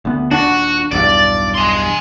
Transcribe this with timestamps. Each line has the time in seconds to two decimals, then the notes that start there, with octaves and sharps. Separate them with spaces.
0.05 D2 B3
0.31 D#1 D4 F#4
0.91 B1 E2 G2 D5
1.55 G#5 C6